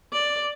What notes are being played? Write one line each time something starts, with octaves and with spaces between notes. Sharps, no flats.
D5